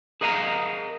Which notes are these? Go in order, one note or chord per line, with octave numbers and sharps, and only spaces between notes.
G#4 A#4 D#5 F5 F#5 A#5